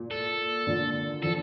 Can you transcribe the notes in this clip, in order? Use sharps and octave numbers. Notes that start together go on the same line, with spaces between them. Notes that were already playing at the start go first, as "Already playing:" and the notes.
Already playing: A#2
A4
A#2 D3
D3 F3 A4